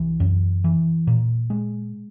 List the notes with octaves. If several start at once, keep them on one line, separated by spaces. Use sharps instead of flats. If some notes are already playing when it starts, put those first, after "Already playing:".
Already playing: C2 E3
F#2
E3
A#2
G#3